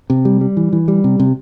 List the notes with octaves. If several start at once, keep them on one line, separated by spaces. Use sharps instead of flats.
C3
G3
G3
E3
E3
G3
C3
C3